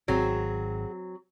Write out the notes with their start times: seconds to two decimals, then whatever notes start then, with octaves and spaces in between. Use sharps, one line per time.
0.08 G#1 F#3 C4 F#4 G#4